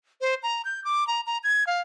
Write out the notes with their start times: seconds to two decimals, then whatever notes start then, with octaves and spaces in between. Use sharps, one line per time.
0.21 C5
0.43 A#5
0.65 G6
0.84 D6
1.07 A#5
1.26 A#5
1.44 G#6
1.67 F5